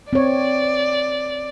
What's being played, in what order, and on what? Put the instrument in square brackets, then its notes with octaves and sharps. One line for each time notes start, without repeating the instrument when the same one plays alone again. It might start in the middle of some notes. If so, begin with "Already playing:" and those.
[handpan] C4 C#5 [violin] D5